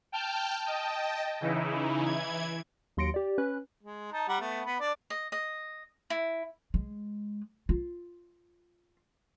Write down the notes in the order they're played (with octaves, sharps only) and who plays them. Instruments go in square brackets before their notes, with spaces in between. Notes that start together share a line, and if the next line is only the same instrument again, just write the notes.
[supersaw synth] G5 A5 F6 G6
D#5 G5 A5
C#3 E3 D#4 E4
E3 E4 G#6
[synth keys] D#2 F#3 C6 A#6 C#7 D7
G4 D5
C#4 B4 F#6
[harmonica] G#3
D#4 A5
G3 F#5 A#5
A3 B3
B3 B4
D4 D5
[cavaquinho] D#5
D#5
E4
[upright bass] G#3
F4